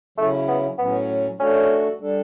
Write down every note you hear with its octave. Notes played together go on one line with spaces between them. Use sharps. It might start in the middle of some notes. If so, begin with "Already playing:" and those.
C#3 F#3 A3 C#4 E4
B3
A2 F#3 B3 C#4
A3 C#4 D4 F#4 A4
G3 D4 A4